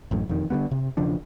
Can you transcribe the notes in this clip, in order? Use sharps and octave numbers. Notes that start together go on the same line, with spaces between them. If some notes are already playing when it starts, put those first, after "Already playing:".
A1 F#2 A2
E1 F2 D#3
D3 F3 G3 B3
C3
E1 C#3 F3 D4